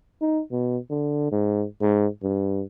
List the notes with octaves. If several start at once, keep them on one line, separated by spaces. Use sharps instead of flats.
D#4
B2
D3
G#2
G#2
G2